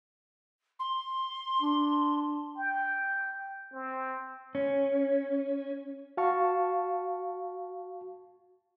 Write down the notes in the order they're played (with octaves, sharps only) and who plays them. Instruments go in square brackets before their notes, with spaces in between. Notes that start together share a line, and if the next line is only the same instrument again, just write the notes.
[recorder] C6
[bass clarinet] D4
[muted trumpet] G5
C4
[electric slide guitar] C#4
[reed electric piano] F#4 F5 A5 C#6